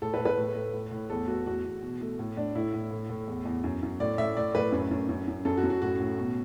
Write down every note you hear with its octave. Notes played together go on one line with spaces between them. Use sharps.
A2 A4
B4
A2
B4
A2
A3
A2
A2
E2 A4
A3 F#4
E2 F#4
E2
B2
A3
A2
A2 D4
A2 E4
A2
A2
A2
E2
E2
F#2
F#2
A2 D5
A2 E5
A2 D5
A2 B4
F#2
F#2
F#2
F#2
F#2 A4
F#4
F#2
F#4
A2 F#4
A2
B2